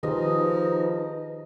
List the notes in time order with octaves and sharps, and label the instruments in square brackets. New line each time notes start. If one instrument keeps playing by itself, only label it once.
[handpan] D#3 G4 G#4 [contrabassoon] F3 [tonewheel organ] D#4 B4 A#5 [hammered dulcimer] D#5